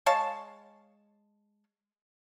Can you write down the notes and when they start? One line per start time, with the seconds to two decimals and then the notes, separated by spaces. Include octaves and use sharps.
0.06 G#3 C#5 F5 A5